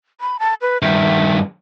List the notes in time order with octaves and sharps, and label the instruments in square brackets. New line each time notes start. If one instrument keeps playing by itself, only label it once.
[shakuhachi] B5
A5
B4
[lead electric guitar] G2 D#3 [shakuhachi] E5